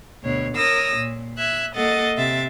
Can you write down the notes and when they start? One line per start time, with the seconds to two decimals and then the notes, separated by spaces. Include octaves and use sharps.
0.22 D2 B2 C#5
0.55 A#4 C#5 D#6 E6 A#6
0.96 A#2
1.38 E5 F#6 G#6
1.75 A#3 A4 D#5 F#5 A6
2.17 C3 E5 A6